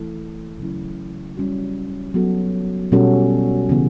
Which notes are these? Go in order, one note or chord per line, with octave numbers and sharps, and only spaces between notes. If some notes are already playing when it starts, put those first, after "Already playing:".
Already playing: E3 A3 E4 A4
C#3 F#3 C#4 E4
G3 C#4 F#4
F#3 B3 F#4 A4
B2 G3 C#4 F#4 A4
C#3 E3 B3 E4